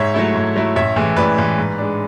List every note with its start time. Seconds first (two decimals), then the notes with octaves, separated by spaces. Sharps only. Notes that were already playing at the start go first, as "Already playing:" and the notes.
Already playing: G#2 C#5 E5
0.14 F#3 A3 E4
0.34 G#2
0.56 F#3 A3 E4
0.76 A1 C#5 E5
0.96 A2 E3 G#3
1.17 A1 B4 D5
1.37 A2 E3 G#3
1.58 G#2
1.78 G#3 D4